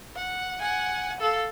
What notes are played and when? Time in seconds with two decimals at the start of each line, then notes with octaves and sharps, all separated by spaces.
0.16 F#5
0.60 F#5 G#5
1.20 A4 F5